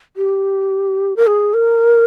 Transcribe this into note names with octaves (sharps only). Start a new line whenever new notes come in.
G4
A#4
G#4
A#4